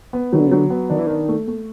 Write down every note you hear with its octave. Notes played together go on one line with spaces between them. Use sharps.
B3
D#3 F#3
D3
C#3
D3 F#3
B3
D#3 D4
E3
D#3 D4
A3
A3